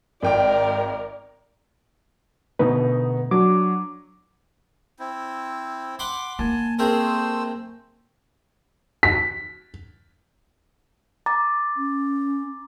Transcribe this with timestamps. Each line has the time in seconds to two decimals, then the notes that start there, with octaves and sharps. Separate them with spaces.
0.23 G#1 A#4 D5 G5 D7
2.59 B2 D3 A3 B3 D#4 B4
3.31 F#3 D4 D6
4.99 C4 E4
5.99 F#5 B5 C6 D6
6.39 A#3 G#5 A5
6.79 A3 C4 G#4 A#4 C5 E6
9.03 B6
11.26 A#5 D6 A6
11.77 C#4